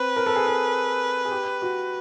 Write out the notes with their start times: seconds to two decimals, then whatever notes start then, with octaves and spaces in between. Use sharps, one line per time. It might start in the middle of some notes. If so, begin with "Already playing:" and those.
Already playing: C4 B4
0.16 A#4
0.26 A4
0.36 G#4
0.47 A4
1.25 G#4
1.31 G4
1.62 F#4